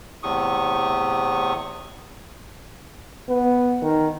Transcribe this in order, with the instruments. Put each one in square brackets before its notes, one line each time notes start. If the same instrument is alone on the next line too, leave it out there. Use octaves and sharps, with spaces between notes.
[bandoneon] E2 A2 C3 C#6 D#6
[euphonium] B3
D#3